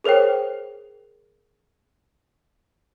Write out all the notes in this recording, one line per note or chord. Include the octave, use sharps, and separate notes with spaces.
G#4 A#4 C5 C#5 G5